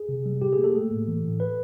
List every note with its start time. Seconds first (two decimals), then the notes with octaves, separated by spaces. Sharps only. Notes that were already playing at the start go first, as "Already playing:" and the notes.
Already playing: G#4
0.09 C3
0.26 G3
0.42 A#2 G4
0.53 G#4
0.58 A#3
0.64 A4
0.74 A3
0.91 A2
1.07 E3
1.24 A2
1.40 B4